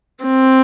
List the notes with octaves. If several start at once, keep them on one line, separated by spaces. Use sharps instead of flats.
C4